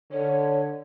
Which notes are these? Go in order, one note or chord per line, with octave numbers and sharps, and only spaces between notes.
D3 C#5